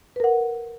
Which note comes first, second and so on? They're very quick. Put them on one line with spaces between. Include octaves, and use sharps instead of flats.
B4 A#4 F#5